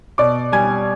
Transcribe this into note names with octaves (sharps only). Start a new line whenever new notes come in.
B2 D5 D6
G3 G#5 G#6